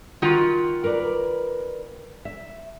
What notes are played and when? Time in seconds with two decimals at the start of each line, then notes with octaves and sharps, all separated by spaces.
0.22 D#3 F4 F#4 F#5 G5
0.84 A#4 B4 D5
2.25 E5